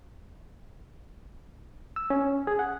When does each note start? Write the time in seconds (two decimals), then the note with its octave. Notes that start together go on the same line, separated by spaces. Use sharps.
1.96 E6
2.10 C#4
2.47 G#4
2.59 F#5